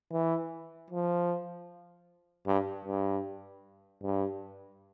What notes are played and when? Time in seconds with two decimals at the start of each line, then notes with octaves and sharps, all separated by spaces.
0.12 E3
0.90 F3
2.47 G2
2.86 G2
4.03 G2